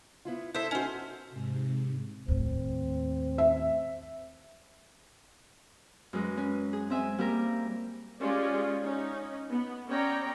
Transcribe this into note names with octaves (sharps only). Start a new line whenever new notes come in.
B3 E4 F4
E4 A4 C5 E5
C#4 D#4 F#4 C5
G#2 C3
D#2 A2 C4
E5
F#2 G#3 B4
C#4
G#4
G#3 C4 E5 G#5
G3 A#3 G4 A#4
G#3 C#4 F4 G4 D5
C#4 D#4
B3
B3 C#4 C#5 D5 G5 A#5